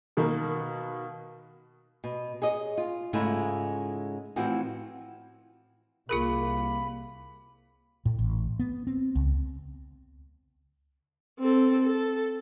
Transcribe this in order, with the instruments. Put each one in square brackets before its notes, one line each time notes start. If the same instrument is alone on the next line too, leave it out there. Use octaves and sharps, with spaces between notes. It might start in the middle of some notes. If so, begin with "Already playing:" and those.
[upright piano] B2 D#3 A#3
[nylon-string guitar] B2
G#4 C#5 D#5
F4
G#2 C#3 G#3 A3 E4 F4
A2 E3 F3 C4 F#4
[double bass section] C2 [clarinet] A#3 [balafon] F4 G#4 A#4 [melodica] B5
[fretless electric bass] A2
A1
B3
C4
C#2
[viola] C4 A4
A4